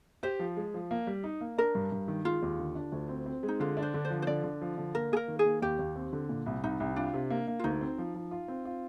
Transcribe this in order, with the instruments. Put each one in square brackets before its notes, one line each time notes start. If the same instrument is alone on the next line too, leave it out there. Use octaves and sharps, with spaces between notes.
[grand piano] G4 [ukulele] C5
[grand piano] F3
G#3
F3
A#3
G3
D#4
A#3
[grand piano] D4 [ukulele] A#4
[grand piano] G2
G2
D#3
[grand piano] G#3 [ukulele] F4
[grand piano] D#2
D3
D4
D2
C4
C4
G#3
[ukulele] D#4
[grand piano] D3 [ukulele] F4
[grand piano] D4
[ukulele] C5
[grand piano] D3
[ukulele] C5
[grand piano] F3
[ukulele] C5
[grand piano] D3 [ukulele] D5
[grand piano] D3
F3
D3
[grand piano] A#3 [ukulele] A#4
[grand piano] A#3 [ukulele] G#4
[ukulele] A#4
[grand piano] D#3
[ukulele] G#4
[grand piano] A#3
[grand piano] D#2 [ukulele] G4
[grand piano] D#2
C4
D3
A#2
C2
[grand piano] C2 [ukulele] D#4
[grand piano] C2
[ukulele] D4 [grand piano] F4
[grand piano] C3
A#3
A#3
[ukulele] F4
[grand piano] D2 [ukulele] D#4
[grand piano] C4
F3
F3
F4
C4
F4